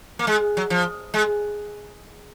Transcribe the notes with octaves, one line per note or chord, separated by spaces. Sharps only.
A#3
G#3
F#3
F3
G#3